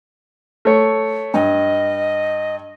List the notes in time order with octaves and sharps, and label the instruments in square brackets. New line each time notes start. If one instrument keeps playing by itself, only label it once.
[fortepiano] A3 C#5
[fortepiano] G2 [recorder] D#5